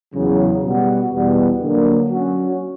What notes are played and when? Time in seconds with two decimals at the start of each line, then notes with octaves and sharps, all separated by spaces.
0.12 E2 C#3 F#3
0.62 B2 G3 B3 F#4
1.10 E2 B2 G3 B3
1.59 D3 F#3 A#3 D4
2.07 F#3 C#4 F#4